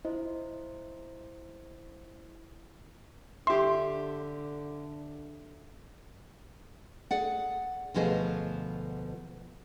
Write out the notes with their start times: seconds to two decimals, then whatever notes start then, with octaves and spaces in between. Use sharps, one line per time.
0.05 E4 F4 C5 D#5
3.47 D3 G4 E5 C6
7.11 G#4 D5 F#5
7.94 D2 B2 F3 G#4 D#5